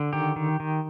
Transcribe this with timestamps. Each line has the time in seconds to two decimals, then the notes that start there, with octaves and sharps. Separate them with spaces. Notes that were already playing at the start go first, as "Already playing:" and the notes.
Already playing: D3
0.13 D#3 G4
0.36 D#3
0.60 D#3